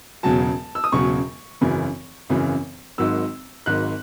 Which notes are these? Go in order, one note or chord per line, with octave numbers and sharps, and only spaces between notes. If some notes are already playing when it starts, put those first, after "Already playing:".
E1 E2 C#3 F#3 A5
E6
D#6
E1 E2 C#3 F#3 C#6
G#1 F#2 C#3 E3
G#1 F#2 C#3 E3
G#1 G#2 D#3 F#3 E6
G#1 G#2 D#3 F#3 F#6